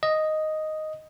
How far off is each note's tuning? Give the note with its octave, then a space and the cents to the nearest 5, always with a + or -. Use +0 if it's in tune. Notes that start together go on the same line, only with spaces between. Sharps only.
D#5 +0